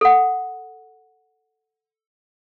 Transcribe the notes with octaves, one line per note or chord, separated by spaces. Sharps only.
A4 F#5